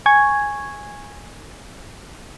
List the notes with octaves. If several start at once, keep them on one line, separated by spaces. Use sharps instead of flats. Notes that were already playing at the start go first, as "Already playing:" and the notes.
G#5 C#6 G#6